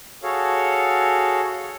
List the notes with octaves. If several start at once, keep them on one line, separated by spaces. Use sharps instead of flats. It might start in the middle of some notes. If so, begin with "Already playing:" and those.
F#4 G#4 A4 C#5 F5